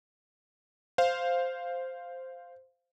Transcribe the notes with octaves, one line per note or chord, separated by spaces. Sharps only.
C5 F5